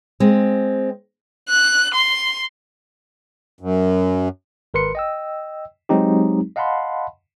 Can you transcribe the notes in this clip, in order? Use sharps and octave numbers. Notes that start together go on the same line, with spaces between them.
G#3 C4
F#6
C6
F#2
G#1 A#4 B4 C6 C#7
D#5 G5 E6
F#3 G#3 C4 D#4 G4
D#5 F5 F#5 A5 B5 C6